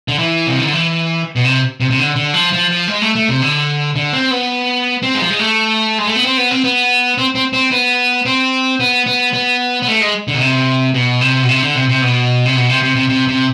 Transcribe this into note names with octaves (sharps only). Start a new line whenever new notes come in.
D3
E3
C3
D3
E3
B2
C3
C3
C3
D3
D3
F3
F3
F3
G#3
A3
A3
C3
D3
D3
C4
B3
C4
G#3
F3
G#3
A3
G#3
A3
B3
C4
B3
C4
B3
C4
C4
C4
B3
C4
B3
B3
B3
B3
A3
G#3
D3
B2
C3
B2
C3
B2
C3
D3
C3
C3
B2
C3
B2
C3
C3
C3
C3
C3